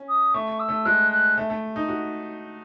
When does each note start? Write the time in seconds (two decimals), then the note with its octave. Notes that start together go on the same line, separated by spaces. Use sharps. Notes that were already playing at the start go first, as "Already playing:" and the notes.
Already playing: C#4
0.09 D#6
0.34 A3 C#6
0.60 E6
0.69 A3
0.86 G#3 F#6
1.12 F#6
1.38 A3
1.50 A3
1.76 D#4
1.89 F#4